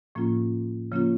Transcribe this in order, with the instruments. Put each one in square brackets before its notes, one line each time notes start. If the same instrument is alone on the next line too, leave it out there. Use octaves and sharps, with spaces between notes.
[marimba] A2 F3 A#3 C#4 F4
C#3 F3 A#3 C#4 F4